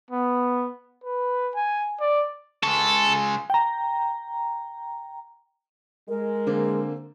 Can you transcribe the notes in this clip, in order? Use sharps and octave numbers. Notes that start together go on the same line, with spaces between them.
B3
B4
G#5
D5
C#3 G#3 A4
G5 A#5
G#3 A#4
D3 A#3 C4